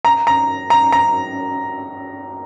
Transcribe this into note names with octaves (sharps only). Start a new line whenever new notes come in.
A#5
A#5
A#5
A#5